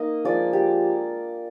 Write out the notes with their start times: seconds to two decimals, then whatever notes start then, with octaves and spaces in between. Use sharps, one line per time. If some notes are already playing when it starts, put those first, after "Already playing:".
Already playing: A#3 D#4 D#5
0.25 F3 G#3 D4 D5
0.53 G4